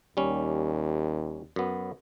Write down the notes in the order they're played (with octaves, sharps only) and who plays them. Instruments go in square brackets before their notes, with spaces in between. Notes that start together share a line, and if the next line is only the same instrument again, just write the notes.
[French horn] D#2 [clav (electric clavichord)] G3 C#4
[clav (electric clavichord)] F#2 B3